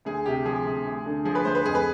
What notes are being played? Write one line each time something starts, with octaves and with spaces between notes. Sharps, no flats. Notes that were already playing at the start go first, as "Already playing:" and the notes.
D2 G#4
C3 G4
F3 G#4
D2
D2
D3
F3 G#4
B4
D2 C5
B4
F2 G#4
B4